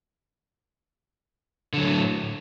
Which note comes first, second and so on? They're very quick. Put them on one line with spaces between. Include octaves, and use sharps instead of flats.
D3 F#3 A2